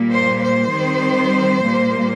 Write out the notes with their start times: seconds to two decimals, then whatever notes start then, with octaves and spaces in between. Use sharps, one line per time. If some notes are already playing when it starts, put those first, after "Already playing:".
Already playing: A#2 G3 A#3
0.10 C5
0.40 C5
0.71 D#3 G3 C4
1.62 A#2 G3 A#3